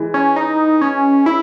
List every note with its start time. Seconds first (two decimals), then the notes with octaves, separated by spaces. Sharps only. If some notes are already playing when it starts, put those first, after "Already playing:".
Already playing: E3 G#3
0.14 C#4
0.36 D#4
0.81 C#4
1.26 E4